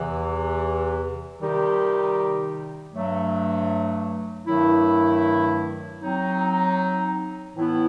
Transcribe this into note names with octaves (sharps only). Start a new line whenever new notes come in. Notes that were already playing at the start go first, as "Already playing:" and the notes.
Already playing: E2 C3 E3
C3 D#3 G3 D#4 G4
G2 F#3 A3
G2 D#3 F#3 A3 E4
F#3 C4 D#4
A2 E3 B3 E4